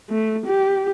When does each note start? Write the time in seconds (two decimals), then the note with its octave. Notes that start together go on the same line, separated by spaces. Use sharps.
0.10 A3
0.46 G4